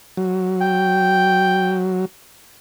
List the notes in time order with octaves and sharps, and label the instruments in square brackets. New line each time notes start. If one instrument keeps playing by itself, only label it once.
[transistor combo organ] F#3
[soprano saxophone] G5